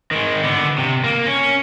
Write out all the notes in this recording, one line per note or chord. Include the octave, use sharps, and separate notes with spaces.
D#3 G#3
D3 B3
C3
A#3
C#4